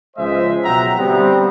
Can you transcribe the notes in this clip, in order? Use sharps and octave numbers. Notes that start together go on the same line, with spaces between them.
C#2 F3 G#3 C5 D#5 E5
B2 F#3 E5 F#5 G5 A#5
D3 G3 B3 C4